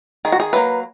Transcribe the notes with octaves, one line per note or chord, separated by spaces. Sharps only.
D#3 G#4
F#4
G#4
F#3 A#3 B4